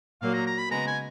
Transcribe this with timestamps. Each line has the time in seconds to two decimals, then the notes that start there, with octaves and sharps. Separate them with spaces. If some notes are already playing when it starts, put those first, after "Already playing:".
0.22 A#2 F#3 A#3 F5
0.33 A#5
0.47 A#5
0.58 B5
0.70 C#3 G#3 B3 A#5
0.87 G#5